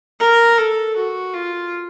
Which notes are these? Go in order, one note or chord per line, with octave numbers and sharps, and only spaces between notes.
A#4
A4
F#4
F4